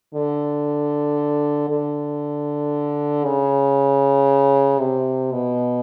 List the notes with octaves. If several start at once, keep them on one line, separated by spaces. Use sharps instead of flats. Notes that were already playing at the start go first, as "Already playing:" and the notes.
D3
D3
C#3
C3
B2